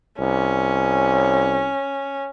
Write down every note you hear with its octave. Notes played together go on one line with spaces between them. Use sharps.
C2 C#4